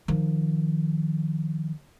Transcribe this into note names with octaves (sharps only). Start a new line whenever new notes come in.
D#3 F3